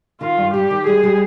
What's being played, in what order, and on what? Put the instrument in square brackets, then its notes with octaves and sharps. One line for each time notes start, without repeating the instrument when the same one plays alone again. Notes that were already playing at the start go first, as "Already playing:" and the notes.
[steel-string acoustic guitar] D#3 [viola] F4
[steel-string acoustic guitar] G2
[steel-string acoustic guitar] G3 [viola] G4
[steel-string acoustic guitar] D#3
[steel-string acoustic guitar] G3 [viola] G#4
[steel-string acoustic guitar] G3